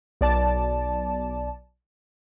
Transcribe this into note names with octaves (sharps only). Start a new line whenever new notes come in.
B1 D5 A5